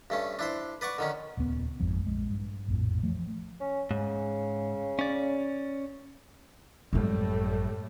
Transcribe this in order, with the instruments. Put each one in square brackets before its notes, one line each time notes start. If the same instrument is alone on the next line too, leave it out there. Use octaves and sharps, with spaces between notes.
[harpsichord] G2 A3 C#4
D4 E4 C5
B4 D5 F#5 C#6
D3 D#3 C#4
[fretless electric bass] D#1 C#2 B2 B3
G#1 F2 G#2 F3
A#1 G#3
G2
A#1 F2 A2
E3 F3 A3
[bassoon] C#4
[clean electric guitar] G#2 [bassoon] C#3
[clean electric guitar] C#4 D5
[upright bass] G#1 F#2 [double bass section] A2 G3 A3